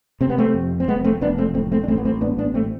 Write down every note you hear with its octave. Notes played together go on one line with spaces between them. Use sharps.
C3 C4
B3
A3 C4
F2
C4
F1 G#3 B3
A3 C4
F1 B3 D4
A3 C4
A1 A3 C4
A3 C4
D4
A1 A3 C4
B3
A3 C4
G#2 B3 D4
B3 D4
A3 C4